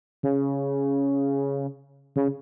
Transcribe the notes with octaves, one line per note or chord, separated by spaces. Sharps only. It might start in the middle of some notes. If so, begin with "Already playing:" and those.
C#3
C#3